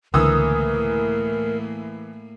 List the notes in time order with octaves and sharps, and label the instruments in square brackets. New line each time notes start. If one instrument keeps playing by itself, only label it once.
[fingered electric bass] C#2 D3 [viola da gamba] A2 A#3 [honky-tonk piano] E3 D#6 E6 [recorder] A#4